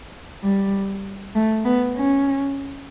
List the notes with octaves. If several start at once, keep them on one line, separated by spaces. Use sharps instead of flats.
G3
A3
B3
C#4